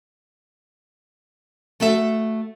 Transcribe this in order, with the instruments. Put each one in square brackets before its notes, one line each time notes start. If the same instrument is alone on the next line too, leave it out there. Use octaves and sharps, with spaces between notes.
[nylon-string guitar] A3 F#4 A4 E5